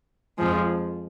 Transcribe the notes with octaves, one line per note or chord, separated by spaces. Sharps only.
F2 F3 G#3